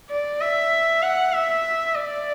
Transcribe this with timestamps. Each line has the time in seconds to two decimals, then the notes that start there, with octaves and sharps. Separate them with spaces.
0.10 D5
0.41 E5
1.02 F#5
1.33 E5
1.96 D5